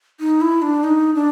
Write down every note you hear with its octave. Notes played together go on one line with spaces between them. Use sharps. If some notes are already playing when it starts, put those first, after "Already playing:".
D#4
E4
D4
D#4
D4